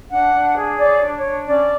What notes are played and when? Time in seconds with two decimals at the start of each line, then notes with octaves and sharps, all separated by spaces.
0.10 D4 F#5
0.33 D4
0.55 G#4
0.78 C#5 D5
1.01 D4
1.12 C#5
1.24 D4
1.46 C#4 D5